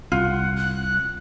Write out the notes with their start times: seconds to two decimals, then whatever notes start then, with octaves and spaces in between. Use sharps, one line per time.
0.12 C2 F4 F#5
0.56 F#6